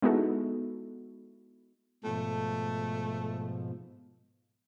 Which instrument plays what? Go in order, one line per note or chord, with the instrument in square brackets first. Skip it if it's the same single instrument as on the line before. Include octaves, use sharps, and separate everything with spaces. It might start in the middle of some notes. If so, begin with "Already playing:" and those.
[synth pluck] G#3 B3 D#4 E4 F#4 A4
[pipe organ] G#2 B2 F3 [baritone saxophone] A3